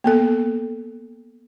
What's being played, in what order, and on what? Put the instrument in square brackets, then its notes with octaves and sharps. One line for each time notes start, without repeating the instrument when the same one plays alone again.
[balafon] A#3 B3 A4